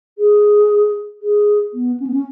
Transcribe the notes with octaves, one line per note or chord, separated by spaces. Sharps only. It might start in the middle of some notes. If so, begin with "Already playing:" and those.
G#4
G#4
B3
C#4
B3
C#4